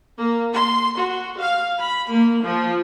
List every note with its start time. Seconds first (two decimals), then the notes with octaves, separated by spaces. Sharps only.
0.18 A#3
0.54 C6
0.96 F#4
1.39 F5
1.79 B5
2.12 A#3
2.43 F3